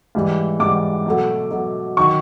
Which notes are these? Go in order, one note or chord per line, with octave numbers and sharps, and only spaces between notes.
G#2 E3 G3
G#2 E3 G3 D6
B2 F#3 A3
B2 F#3 A3
D#3 F#3 C#6